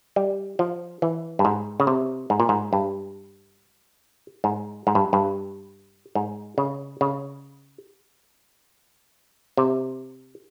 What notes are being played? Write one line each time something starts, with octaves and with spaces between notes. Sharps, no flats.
G3
F3
E3
G2
G#2
C#3
C3
G#2
A#2
G#2
G2
G#2
G#2
G2
G2
G#2
C#3
C#3
C3